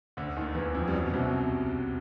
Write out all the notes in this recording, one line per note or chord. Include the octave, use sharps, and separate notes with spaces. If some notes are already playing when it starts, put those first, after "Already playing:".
D2 D3
D#2 D#3
E2 E3
F2 F3
G3
F#2 F#3
B2
C2 C3